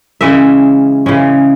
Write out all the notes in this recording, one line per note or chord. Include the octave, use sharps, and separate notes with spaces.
C#3 E3 G#3 C#4 E5
C#3 E3 G#3 C#4